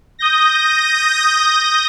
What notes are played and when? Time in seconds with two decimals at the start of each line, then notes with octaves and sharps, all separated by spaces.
0.19 D#6 G6 A#6